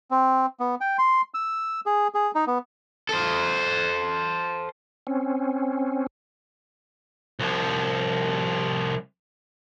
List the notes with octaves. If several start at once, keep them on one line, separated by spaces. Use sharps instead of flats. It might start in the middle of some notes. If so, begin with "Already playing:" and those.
C4
B3
G5
C6
E6
G#4
G#4
D#4
B3
A4 C5
C4 C#4
C2 F3